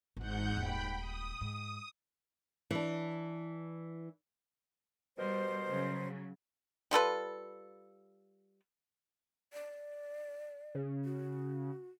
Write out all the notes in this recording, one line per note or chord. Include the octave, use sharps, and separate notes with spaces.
G#1 G#2 E3 F#5 G6
D#1 G5 B5
D#6
G#2
E3 D4
B2 G3 A#4 C5
C#3 F#3
G3 F4 A4 B4
D5
C#3
F#4